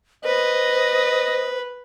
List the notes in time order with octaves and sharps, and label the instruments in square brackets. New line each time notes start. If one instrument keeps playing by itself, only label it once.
[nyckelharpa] B4 [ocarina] C5 [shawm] D#5